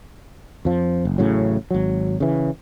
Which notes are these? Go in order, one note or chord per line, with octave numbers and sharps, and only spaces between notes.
F2 F3
F#1
A1 A2 C#3 F#3
G#1 F#3
C#3 E3